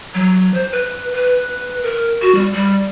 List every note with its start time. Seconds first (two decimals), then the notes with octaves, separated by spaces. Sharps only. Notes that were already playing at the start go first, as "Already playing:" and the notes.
0.15 F#3
0.54 C5
0.72 B4
1.13 B4
1.83 A#4
2.22 F#4
2.35 G3
2.53 G3